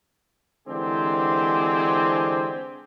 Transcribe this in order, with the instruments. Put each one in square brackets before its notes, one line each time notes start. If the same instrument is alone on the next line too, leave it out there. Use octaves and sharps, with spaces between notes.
[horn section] D3 E3 G#3 C4 G4 G#4